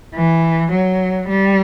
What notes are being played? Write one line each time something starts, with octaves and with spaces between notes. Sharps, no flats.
E3
F#3
G3